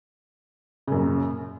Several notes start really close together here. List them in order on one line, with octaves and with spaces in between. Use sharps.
C#3 F#2 A#2